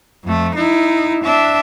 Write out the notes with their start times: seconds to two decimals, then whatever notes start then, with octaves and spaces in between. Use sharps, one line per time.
0.24 F2 A3
0.55 D#4 E4
1.24 D4 E5